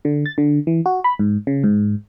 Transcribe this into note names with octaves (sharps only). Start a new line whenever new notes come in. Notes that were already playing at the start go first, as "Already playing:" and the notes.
D3
A6
D3
E3
F#4
B5
G#2
C#3
G#2